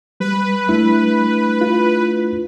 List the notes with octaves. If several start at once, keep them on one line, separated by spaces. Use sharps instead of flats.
G3 B4
A3 D4 E4
F4